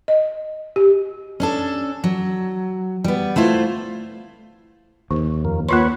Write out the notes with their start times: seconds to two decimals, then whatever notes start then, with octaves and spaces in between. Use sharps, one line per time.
0.08 D#5
0.76 G4
1.40 C#4 D4 A4
2.04 F#3
3.04 G3 B3
3.36 A3 E4 F4 C5
5.11 D#2 D#3
5.45 F2 A#3
5.69 A#3 F4 B4 C#5 C6